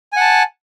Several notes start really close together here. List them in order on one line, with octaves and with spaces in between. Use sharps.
G#5 F#5 A5